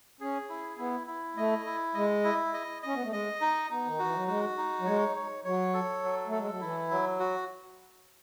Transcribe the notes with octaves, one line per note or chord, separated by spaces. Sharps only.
C#4 G#4
E4
B3 E4
E4
A3 D#5
E4
G#3 D#5
E4
D#5
C#4 D#5
B3
A3
G#3 D#5
D#4
B3 D#4
D#3
E3 F#4
F#3
G#3 F#4
D#4
F#3
G#3 C#5
C#5
F#3 C#5
A4
F#3
A3
A4
G#3
F#3
E3 E4
F#3
F#4